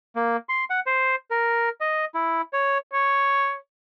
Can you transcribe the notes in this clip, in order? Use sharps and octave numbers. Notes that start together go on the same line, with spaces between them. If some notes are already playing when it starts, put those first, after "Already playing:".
A#3
C6
F#5
C5
A#4
D#5
E4
C#5
C#5